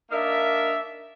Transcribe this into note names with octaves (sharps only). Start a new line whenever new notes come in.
A#3 D4 D#4 A#4 D5 E5